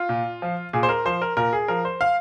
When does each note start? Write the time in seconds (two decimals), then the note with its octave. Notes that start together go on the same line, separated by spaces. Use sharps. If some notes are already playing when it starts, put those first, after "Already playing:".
Already playing: F4
0.09 A#2
0.42 F3
0.73 A#2 G#4
0.83 C5
0.89 A#4
1.05 F3 C5
1.22 A#4
1.37 A#2 A#4
1.53 G#4
1.68 F3 A#4
1.85 C5
2.01 F5